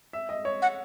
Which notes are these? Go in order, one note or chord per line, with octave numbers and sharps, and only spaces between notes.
E5
D#5
C#5
F#5